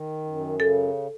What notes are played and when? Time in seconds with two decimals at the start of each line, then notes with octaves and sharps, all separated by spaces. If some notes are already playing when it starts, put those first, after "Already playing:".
Already playing: D#3
0.25 F#2
0.60 C#3 A4